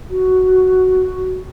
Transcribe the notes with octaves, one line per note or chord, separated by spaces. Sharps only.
F#4